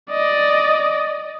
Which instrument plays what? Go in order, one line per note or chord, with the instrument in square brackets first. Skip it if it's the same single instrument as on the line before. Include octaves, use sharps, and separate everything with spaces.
[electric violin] D5 D#5